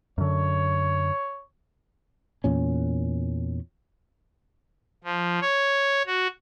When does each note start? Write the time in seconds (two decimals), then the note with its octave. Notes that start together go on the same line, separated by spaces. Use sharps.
0.18 F#2 D3 C#5
2.44 E2 A#2 C#4
5.04 F3
5.42 C#5
6.06 F#4